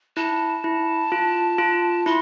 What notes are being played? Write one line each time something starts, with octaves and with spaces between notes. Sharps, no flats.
E4 A5
E4
F4
F4
E4 C6